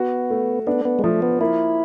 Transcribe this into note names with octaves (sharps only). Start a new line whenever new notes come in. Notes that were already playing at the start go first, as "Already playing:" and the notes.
Already playing: B3 F#4
A3
B3 D4
B3
G#3
F3 A3
B3
A#3 E4